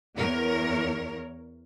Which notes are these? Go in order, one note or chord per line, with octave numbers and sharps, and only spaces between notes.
E2 A#4 C#5